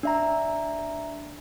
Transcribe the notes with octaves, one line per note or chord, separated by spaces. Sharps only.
D4 E5 A#5